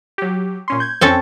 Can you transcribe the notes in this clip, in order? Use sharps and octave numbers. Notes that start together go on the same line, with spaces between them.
F#3 G4
A#2 C#4 C6
G6 G#6
F2 C4 C#4 A4 G5